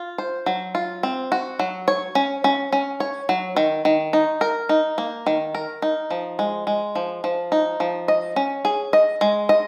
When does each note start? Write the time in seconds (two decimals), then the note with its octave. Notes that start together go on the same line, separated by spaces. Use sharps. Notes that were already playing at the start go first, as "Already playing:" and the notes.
Already playing: F4
0.18 C5
0.46 F#3
0.75 F4
1.03 C4
1.32 F#4
1.59 F#3
1.88 C#5
2.15 C#4
2.44 C#4
2.72 C#4
3.00 C#5
3.29 F#3
3.56 D#3
3.85 D#3
4.13 D#4
4.41 A#4
4.69 D#4
4.98 A#3
5.26 D#3
5.55 A#4
5.82 D#4
6.11 F3
6.39 G#3
6.67 G#3
6.95 F3
7.24 F3
7.52 D#4
7.80 F3
8.08 D#5
8.36 C#4
8.65 G#4
8.93 D#5
9.21 G#3
9.49 D#5